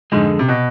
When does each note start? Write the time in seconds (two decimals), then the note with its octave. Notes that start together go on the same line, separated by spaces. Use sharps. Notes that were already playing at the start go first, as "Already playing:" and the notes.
0.12 F2 G#2 D3 G#3
0.39 C3
0.48 B2